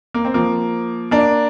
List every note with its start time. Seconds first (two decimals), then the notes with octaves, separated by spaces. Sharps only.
0.14 A#3
0.25 C4
0.34 F3 A#3
1.11 A#3 D4